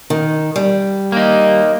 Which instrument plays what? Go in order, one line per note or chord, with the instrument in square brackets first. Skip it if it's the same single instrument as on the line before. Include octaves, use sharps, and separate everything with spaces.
[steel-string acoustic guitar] D#3
G3
[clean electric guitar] A#3 D#4